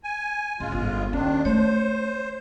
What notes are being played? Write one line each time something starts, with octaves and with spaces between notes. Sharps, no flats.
G#5
A1 G#3 F4
G1
D#2 D#3 C#4 D4
A3 C5 C#5